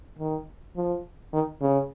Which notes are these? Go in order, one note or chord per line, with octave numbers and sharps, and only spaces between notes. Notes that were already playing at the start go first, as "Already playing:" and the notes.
D#3
F3
D#3
C#3